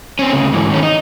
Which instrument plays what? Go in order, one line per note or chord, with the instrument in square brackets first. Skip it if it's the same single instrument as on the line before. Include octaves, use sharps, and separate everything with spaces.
[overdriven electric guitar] C4 C#4
D2 C#3
G#2 E3
D#3 C#4
D#4